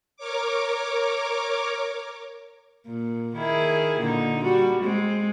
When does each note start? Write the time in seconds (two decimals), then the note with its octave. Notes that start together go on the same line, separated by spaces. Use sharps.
0.17 A#4 C#5 D6
2.86 A#2
3.36 D#3 E4 G#4
3.99 A#2 D3 D#4
4.43 G3 F#4
4.82 G#3 C4